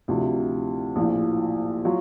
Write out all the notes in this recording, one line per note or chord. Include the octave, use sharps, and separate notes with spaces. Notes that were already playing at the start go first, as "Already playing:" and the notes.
D2 C3 F3 E4
A#1 A2 F3
F#3 F4